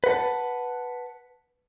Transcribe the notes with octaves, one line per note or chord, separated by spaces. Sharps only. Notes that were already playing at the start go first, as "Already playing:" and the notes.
B4 F#5 A5